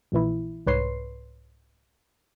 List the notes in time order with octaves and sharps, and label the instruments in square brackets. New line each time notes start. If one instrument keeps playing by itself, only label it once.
[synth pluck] A#1 A#2 E3 E4
C2 G#2 B4 C#5 C6 C7